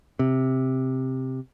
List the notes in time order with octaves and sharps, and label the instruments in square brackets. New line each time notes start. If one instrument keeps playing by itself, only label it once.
[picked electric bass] C3